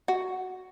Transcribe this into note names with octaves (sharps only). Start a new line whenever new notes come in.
F#4